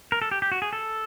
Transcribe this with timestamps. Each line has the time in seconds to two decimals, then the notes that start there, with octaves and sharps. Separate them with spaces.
0.12 A#4
0.22 A4
0.31 G4
0.42 G4
0.52 F#4
0.62 G#4
0.73 A4